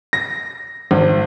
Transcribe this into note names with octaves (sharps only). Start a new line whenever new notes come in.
A#6
G#1